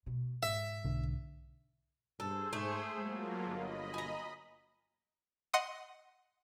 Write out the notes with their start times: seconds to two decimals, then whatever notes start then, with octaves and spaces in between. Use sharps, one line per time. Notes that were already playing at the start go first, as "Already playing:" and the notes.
0.06 B2 A3
0.43 G#2 E5
0.84 B1 D3
2.20 G2 G#4 A4 C5
2.53 G#2 A3
2.98 F#3 G#3 A#3 F4
3.46 G1 D#5 B5
3.94 G#5 A#5
5.54 D#5 F#5 C6 D#6